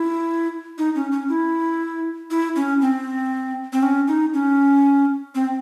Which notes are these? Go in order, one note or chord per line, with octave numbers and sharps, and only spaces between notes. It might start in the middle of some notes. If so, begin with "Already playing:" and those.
Already playing: E4
D#4
C#4
C#4
E4
E4
C#4
C4
C4
C#4
D#4
C#4
C4